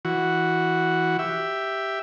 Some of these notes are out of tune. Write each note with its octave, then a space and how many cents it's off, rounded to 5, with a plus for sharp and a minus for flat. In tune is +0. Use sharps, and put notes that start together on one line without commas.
E3 +0 F#4 +0
G4 +0 E5 +0